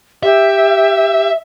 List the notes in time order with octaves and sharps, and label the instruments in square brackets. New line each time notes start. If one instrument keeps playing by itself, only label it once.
[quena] G4 [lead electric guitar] E5